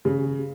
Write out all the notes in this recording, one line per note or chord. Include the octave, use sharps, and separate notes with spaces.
C#3